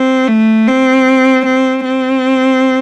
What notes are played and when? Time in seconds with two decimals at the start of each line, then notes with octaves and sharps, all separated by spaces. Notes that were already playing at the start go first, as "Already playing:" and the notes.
Already playing: C4
0.28 A3
0.68 C4
1.45 C4
1.85 C4